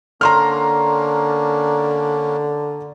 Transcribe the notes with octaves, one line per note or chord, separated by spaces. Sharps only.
D3 A#3 C#4 D4 A#5 C6 F6